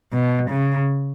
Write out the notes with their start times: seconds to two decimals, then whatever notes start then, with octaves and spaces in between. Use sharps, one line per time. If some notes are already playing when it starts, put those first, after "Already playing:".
0.13 B2
0.50 C#3